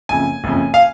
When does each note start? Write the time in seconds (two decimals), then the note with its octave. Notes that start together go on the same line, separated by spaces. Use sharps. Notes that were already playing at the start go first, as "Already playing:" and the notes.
0.09 F#1 F2 C#3 G#5
0.44 F#1 F2 C#3
0.74 F5